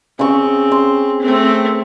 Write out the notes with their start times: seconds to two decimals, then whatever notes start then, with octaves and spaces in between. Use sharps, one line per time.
0.19 C#3 C4 C#6
0.72 C6
1.21 A3 C4